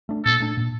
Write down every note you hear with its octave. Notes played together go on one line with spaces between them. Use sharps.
A3 D4
A#2 A4
A3 D4
A#2